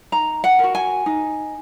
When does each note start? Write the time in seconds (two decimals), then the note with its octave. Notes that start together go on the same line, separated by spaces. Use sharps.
0.12 D#4 A#5
0.44 F#5
0.59 F#4 A#4
0.75 G#5
1.06 D#4